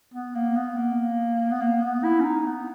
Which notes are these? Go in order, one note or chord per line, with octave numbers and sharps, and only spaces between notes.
B3
A#3
B3
A#3
B3
A#3
B3
E4
C#4
D#4
B3